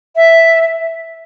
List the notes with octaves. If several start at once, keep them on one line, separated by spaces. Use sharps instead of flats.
E5